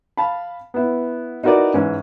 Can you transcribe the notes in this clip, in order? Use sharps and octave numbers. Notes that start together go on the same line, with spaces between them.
F5 A5 B5
B3 E4
D#4 E4 F#4 A#4 B4 D5
G#2 E3 C#4